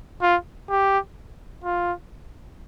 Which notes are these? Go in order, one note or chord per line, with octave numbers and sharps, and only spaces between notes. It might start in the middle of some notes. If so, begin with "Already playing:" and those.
F4
G4
F4